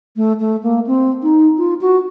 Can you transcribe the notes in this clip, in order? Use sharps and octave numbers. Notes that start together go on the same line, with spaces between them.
A3
A3
A#3
C4
D#4
F4
F#4